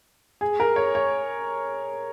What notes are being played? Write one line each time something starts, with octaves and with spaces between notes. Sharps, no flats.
G#4
A#4
C#5
C#5